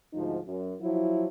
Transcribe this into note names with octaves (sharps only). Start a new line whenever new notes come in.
D2 G#2 F3 D#4
F#2
F3 F#3 E4